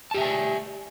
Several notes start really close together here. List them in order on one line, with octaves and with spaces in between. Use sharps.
A5 G4 E5 G#5 D5